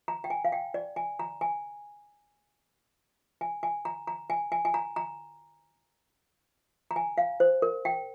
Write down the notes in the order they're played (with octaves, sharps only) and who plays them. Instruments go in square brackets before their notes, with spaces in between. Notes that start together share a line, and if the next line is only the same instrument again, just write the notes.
[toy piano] A#5
G5
G#5
F5
G5
D5
G#5
A#5
G#5
G#5
G#5
A#5
A#5
G#5
G#5
G#5
A#5
A#5
A#5
G#5
F5
C5
A#4
G5